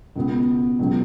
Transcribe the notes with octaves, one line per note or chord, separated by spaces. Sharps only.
C#2 B2 B3
C#2 B2 F#3